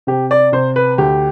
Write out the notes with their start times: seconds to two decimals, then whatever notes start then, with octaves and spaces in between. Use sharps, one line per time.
0.07 C3 G4
0.31 D5
0.52 C3 C5
0.76 B4
0.98 D2 G4